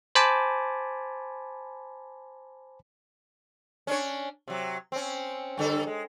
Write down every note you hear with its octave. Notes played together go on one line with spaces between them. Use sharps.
C5 G#5 A5 B5 D6
C#4 D4 C#5
C3 F#3
C4 C#4
G2 D3 A4
G#3